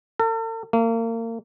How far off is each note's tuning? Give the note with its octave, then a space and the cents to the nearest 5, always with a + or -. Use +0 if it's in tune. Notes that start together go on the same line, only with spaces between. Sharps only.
A4 +45
A#3 -35